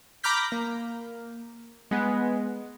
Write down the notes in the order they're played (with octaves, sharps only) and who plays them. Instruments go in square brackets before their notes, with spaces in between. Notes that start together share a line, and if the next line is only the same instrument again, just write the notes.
[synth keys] A#5 B5 D6 F6 G6 B6
A#3
G#3 B3